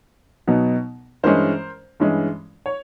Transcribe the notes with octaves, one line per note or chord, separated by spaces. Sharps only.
B2 F#3 B3 D#4
G2 E3 G#3 C#4 A#4 C5
G2 E3 G#3 C#4
C#5